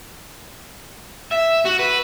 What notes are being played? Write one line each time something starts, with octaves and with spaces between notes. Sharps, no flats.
E5
F#4
B4